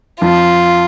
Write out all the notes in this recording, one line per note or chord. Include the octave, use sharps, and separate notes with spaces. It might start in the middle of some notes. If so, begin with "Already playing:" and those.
F2 F3 F4